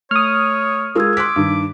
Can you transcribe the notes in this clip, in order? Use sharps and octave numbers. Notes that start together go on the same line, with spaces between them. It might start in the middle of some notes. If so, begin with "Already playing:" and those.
A3 C#5 D#6 F6
G#3 F4 A#4 C#6 E6 G#6
C6 D6 F#6 B6
G2 D#3